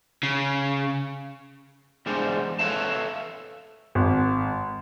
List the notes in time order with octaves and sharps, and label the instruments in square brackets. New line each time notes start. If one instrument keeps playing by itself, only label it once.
[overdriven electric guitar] C#3
[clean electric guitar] E2 G3 G#3 D4 C5
A4 B4 C#5 E5 F5 A5
[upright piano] G#1